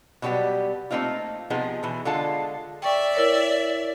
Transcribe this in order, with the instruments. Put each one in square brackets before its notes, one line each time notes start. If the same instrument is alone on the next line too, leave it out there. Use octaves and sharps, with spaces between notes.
[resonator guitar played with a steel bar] B2 F#3 G3 B3 G4
A3 A#3 C4 D#4 F4
C3 F3 B3 D#4 G#4
B2 E3
D3 G#3 F4 A4 A5
[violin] D5 E5 [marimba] G5 C#6
[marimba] E4 A#4 C#5